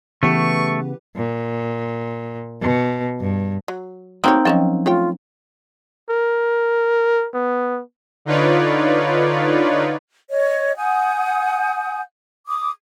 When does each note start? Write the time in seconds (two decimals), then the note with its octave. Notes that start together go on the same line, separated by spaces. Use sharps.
0.23 C#3 E3 A3 B3 G4 B4 C#6
1.16 A#2
2.62 B2
3.21 G2
3.68 F#3
4.24 F#3 A3 A#3 C4 D#4 C#5
4.45 F3 F#3 C#4 D#4 C#5 G5
4.86 A3 F4 C#5 G5
6.09 A#4
7.34 B3
8.25 D3 D#4 F4 B4 C#5 D5
10.30 C#5 D#5
10.77 F#5 G#5 D#6 G6
12.47 D6 D#6